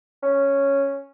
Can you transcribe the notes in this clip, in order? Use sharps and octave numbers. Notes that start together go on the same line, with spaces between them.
C#4